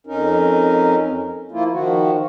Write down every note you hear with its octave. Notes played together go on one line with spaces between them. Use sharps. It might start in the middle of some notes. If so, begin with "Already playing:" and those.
F2 C#4 D#4 A#4
F3 A#3 E4 F4
D#3 F3 F#4